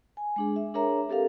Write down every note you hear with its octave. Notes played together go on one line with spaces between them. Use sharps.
G#5
G#3 D4 G#4
E5
D4 G#4 A#4 C#5 E5 A#5
C4 G4 A4 A#4 F5